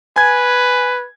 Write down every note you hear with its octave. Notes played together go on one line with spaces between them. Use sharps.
B4 G#5 G#6